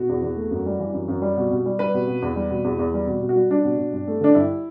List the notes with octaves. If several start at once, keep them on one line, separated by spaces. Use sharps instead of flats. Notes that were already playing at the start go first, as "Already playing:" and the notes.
Already playing: B2 F#4
E2
E2
A3
F#2
G3
E3
F#2
F#2
G3
B2
B2
G3
G3 B4
B2
B2
E2
G3
B2
E2
E2
G3
B2
B2
F#4
G3
G3 D4
B2
B2
G2
A3
D3 D4
G2 E4